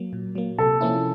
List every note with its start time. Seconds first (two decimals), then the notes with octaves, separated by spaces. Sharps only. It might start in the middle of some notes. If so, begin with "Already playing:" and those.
Already playing: F#3 A#3
0.13 A#2
0.35 F#3 A#3
0.58 C3 A4
0.81 F3 A#3 C#4 E4